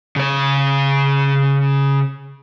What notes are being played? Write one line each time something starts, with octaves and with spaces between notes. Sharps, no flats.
C#3 C#5